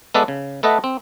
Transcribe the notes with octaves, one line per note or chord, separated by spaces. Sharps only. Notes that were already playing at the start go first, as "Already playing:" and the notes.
G#3 B3 A4 B4 D5 E5
C#3
A3 A4 B4 D#5 E5 F#5
C4